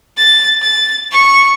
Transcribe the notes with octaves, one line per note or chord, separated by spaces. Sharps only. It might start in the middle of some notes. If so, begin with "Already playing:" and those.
A6
A6
C#6 C#7